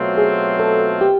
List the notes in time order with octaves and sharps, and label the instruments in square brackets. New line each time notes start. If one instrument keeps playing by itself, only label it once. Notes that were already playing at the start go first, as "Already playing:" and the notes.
Already playing: [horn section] B2 F#3 A3 C4 F4
[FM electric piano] G#4
A4
G4